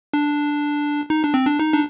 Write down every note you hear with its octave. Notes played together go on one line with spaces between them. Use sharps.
D4
D#4
D4
C4
D4
D#4
D4